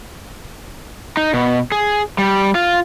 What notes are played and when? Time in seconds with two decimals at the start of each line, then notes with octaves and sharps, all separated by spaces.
1.17 D#4
1.33 B2
1.72 G#4
2.18 G3
2.55 F4